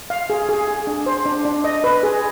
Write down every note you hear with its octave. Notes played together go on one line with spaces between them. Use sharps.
F5
G#4
G#4
G#4
D4
C5
D4
D4
D#5
B4
G#4